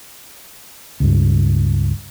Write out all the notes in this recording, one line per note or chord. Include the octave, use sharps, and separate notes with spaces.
C#2 G2